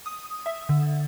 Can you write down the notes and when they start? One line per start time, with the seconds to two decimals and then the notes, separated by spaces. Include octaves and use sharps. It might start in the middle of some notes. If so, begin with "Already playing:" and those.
0.06 D#6
0.46 E5
0.69 D3